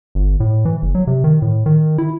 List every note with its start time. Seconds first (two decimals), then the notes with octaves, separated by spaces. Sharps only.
0.15 G1
0.40 A2
0.65 E3
0.82 F#1
0.95 F#3
1.07 C3
1.24 D#3
1.42 A2
1.66 D#3
1.98 E4